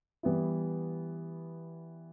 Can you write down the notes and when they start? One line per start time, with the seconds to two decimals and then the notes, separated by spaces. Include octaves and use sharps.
0.23 E3 G3 B3 E4